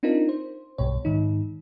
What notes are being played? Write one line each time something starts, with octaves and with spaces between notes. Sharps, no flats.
C4 D4 D#4 F4 A#4
C5
B1 G2 B2 C#5
G#2 D#3 D#4